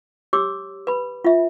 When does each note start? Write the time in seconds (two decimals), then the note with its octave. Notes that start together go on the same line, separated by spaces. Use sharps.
0.33 G4 C#5 D6 E6
0.87 B4 B5
1.25 F4 E5